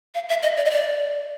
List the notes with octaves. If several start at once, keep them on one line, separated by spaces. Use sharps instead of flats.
F5
E5
D#5
D5
D#5
D5